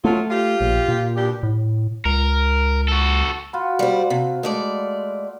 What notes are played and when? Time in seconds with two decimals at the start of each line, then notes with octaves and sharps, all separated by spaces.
0.04 F3 F#3 A3 F4
0.30 F4 G4
0.61 A#1
0.88 A#2
1.16 B2 D4 G4
1.43 A2
2.05 C#2 A#4
2.88 F#4 A4
3.53 F4 F#4 B5
3.79 G3 C5
4.10 C3
4.43 G#3 A3 D5